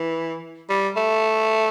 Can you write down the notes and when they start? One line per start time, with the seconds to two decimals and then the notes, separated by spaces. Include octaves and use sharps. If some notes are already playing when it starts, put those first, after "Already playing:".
Already playing: E3
0.69 G3
0.96 A3